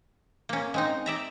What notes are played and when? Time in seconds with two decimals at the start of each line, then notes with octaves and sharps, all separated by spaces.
0.49 A#3 C#4
0.74 G#3 C4 D#4
1.06 D5 E5 A#5